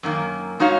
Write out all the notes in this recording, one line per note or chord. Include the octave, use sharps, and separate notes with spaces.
F#2 D#3 A#3
G#3 D#4 F#4 C#5 F5